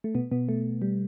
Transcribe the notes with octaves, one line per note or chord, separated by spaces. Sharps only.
A3
B2 B3
B2 B3
A3
G3